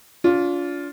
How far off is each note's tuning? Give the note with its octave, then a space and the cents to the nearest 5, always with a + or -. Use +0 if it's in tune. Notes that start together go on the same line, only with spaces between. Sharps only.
D4 -35 F4 +10